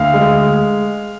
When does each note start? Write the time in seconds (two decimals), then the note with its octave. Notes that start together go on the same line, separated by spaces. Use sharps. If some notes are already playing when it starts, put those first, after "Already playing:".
Already playing: D2 F5
0.14 G#3